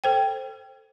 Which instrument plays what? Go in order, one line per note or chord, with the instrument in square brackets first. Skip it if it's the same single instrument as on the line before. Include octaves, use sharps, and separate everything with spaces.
[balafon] A4 C5 G5